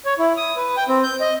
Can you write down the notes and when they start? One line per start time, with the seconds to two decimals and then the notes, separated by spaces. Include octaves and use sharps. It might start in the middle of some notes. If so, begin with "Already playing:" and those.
0.05 C#5
0.19 E4
0.37 D#6
0.56 B4
0.77 G5
0.89 C4
1.03 G6
1.21 D#5